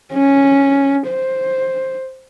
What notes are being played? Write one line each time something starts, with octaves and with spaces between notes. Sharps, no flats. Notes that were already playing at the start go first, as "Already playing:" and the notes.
C#4
C5